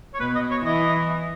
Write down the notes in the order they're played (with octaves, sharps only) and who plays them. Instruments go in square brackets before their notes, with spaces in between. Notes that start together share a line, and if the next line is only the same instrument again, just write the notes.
[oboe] C#5
[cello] B2 [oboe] B4
[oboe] D#5
C#5
[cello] E3 [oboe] D#5